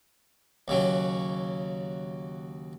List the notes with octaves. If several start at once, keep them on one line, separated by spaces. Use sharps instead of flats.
D#2 C#3 F#3